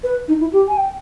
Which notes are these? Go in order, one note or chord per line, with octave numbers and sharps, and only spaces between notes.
B4
D#4
E4
G4
G#5
G5